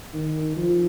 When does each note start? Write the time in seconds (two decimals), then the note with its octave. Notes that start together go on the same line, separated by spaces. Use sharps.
0.14 D#3
0.57 F3